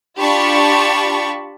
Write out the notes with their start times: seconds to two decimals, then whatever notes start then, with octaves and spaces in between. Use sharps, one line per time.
0.19 D4 F4 G4 A5 B5 C#6